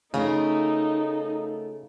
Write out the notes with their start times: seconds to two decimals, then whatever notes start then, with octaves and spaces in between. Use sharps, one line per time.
0.14 C#3 A3 D#4 F4 A#4